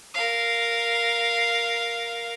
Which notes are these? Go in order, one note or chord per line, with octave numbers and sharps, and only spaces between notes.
A#4 F5